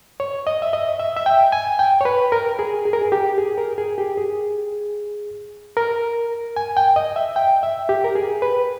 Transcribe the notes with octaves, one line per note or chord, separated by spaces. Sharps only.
C#5
D#5
E5
D#5
E5
E5
G5
G#5
G5
C#5
B4
A#4
G#4
G#4
A#4
G#4
G4
G#4
A#4
G#4
G4
G#4
A#4
G#5
G5
D#5
E5
G5
E5
G4
A#4
G#4
B4